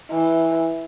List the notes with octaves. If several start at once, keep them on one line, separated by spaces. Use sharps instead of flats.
E3